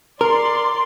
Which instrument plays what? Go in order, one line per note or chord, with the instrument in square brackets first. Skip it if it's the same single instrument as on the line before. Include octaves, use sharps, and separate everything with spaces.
[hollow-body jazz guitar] A#4 [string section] D5 C6